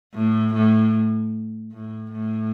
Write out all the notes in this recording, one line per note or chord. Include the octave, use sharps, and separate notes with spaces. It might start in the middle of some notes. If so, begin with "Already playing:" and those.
A2
A2
A2
A2